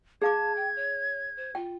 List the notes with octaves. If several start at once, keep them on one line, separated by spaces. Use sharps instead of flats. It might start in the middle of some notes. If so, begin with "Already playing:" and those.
G#4 F5 A5 D6 G#6
G5
C#5
C5
F4 G5